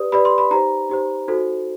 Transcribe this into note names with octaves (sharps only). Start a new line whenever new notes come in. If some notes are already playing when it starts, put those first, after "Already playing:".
Already playing: G4 B4 D5 D#6
G4 B4 D5 B5
C6
B5
D#4 G4 C5 A#5
D#4 G4 C5
D#4 F#4 A4 C5